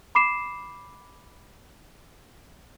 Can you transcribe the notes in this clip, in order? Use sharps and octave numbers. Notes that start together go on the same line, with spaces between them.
B5 D6 C7 E7